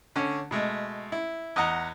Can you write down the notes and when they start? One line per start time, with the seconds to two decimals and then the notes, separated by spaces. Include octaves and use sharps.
0.16 D3 C#4
0.51 B2 G#3 A3
1.12 E4
1.56 E2 D#5 F#5 A#5